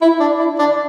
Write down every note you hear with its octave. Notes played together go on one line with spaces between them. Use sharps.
E4
D4
E4
D4